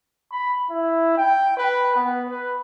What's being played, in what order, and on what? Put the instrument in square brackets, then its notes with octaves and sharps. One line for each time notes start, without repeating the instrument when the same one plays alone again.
[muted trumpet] B5
E4
G5
B4
B3
B4